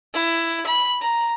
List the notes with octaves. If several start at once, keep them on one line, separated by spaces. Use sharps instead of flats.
E4
B5
A#5